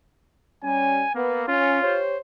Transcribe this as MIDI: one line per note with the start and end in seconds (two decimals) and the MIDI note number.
0.63 1.03 55
0.63 1.03 61
0.63 1.11 80
1.15 1.45 58
1.15 1.44 59
1.48 1.79 61
1.48 2.00 65
1.83 2.17 67
1.83 2.17 72
1.83 2.17 73